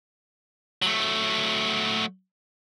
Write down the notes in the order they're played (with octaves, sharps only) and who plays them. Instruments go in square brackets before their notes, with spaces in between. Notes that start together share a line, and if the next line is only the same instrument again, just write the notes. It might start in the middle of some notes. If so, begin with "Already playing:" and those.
[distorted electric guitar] F#3 A3